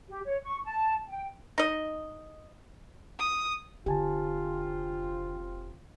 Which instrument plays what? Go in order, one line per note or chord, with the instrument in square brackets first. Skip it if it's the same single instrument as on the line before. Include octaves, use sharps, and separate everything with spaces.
[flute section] G4
C#5
C#6
A5
G5
[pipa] D#4 D#5
[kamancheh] D#6
[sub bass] F1 [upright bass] D3 [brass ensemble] C4 F4 [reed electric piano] G4 G#5 A5